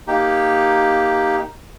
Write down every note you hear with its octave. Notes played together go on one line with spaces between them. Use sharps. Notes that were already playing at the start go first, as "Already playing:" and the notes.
A#3 D#4 G4